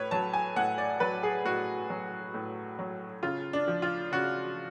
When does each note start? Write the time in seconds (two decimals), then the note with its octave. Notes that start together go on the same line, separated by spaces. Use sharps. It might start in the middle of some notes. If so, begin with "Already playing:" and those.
Already playing: A2 B4 C#5
0.11 F#3 A5
0.33 G#5
0.56 A2 F#5
0.78 D5
1.00 F#3 B4
1.23 G#4
1.45 A2 F#4
1.90 F#3
2.34 A2
2.79 F#3
3.23 C#3 F4
3.53 D4
3.68 F3
3.82 F4
4.12 C#3 F#4